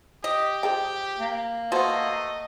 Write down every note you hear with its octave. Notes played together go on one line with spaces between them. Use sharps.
G4 D#5
F3 G#4 G5
A#3
B2 A3 F#4 C5 D#5 F#5